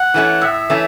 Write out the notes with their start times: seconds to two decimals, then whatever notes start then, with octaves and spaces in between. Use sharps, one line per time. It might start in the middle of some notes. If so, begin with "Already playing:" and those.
Already playing: F#5
0.14 E3 A3 C#4
0.41 A2 E5
0.70 E3 A3 C#4